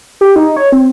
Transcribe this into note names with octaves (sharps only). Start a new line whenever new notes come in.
G4
D#4
C#5
C4